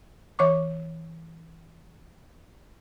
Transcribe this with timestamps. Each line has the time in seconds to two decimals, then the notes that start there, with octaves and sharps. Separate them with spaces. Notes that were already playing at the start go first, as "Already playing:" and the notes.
0.39 E3 C#5 C#6 D6